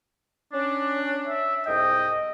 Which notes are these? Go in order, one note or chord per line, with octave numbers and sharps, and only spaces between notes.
C#4 D4
E5
C2 G#2 D#5 G5